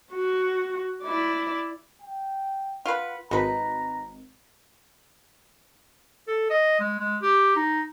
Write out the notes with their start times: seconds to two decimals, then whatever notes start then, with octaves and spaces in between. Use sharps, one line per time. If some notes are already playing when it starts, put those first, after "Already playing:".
0.12 F#4
1.02 E4 D5
2.01 G5
2.85 F4 B4 F#5
3.31 G#1 D#4 B4 A#5
6.27 A4
6.50 D#5
6.80 G#3
6.99 G#3
7.22 G4
7.56 D#4